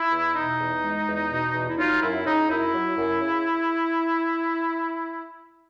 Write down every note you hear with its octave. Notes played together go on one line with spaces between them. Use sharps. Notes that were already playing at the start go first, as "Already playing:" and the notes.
Already playing: E4
E2
B2 D#4
E2
G#3
E2
B2
E2
E4
F#3 D#4 F4
F#2 E4
C#3 D#4
F#2 E4
F#3
F#2
C#3